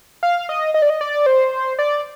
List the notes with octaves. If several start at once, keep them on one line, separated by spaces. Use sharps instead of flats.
F5
D#5
D#5
D5
D#5
D5
C5
D5